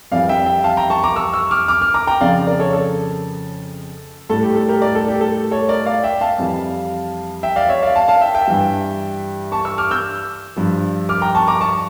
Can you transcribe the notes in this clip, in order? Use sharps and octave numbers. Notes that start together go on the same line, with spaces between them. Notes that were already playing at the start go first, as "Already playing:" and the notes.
F2 E3 G3 D5 F5
E5 G5
E5 G5
F5 A5
G5 A#5
A5 C#6
A#5 D6
C#6 E6
C#6 E6
D6 F6
D6 F6
D6 F6
A#5 D6
G5 A#5
F2 C#3 F3 D5 F5
A#4 D5
A4 C#5
A4
A2 G3 A4
G4
A4
G4 A#4
A#4 D5
A4
G4
A4
A4 C#5
A#4 D5
D5 F5
E5 G5
F5 A5
F2 E3 G3
E5 G5
D5 F5
C#5 E5
D5 F5
F5 A5
F5 A5
E5 G5
E5 G5
G2 E3 G3
A5 C#6
C#6 E6
D6 F6
E6 G6
G2 F3
D6 F6
G5 A#5
A5 C#6
A#5 D6
A5 C#6